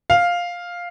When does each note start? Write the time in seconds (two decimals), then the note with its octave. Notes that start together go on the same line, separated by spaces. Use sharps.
0.10 F5